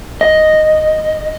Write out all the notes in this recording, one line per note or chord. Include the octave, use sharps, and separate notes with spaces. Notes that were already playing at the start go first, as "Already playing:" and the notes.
D#5